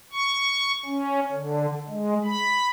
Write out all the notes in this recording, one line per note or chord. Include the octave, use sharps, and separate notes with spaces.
C#6
C#4
D3
G#3
B5